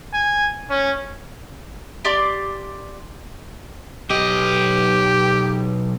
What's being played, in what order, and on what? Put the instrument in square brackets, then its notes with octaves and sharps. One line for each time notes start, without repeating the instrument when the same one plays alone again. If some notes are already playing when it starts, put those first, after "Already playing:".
[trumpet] G#5
C#4
[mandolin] G4 D5 C6 D6
[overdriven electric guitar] B1 D#5 [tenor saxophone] G4